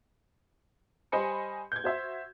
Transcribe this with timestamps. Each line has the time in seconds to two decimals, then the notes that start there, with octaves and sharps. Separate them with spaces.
1.12 G3 C5 D#5 G#5 B5 C#7
1.72 G6 G#6
1.84 F#4 C5 E5